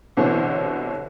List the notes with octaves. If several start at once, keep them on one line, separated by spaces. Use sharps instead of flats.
C2 B2 D3 E3 C5 C#5